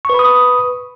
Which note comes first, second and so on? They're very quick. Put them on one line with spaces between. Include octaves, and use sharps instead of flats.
C#6 B4 B5 D#6